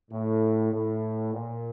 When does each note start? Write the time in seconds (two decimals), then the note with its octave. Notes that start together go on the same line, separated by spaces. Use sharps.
0.11 A2
0.72 A2
1.34 A#2